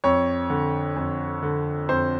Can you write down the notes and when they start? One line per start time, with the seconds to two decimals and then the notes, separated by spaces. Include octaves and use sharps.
0.04 F2 C#5
0.50 D3
0.96 F2
1.43 D3
1.89 F2 C5